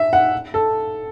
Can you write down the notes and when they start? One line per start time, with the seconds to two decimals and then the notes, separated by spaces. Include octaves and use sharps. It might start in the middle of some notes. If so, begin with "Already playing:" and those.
Already playing: E5
0.13 F#5
0.54 A4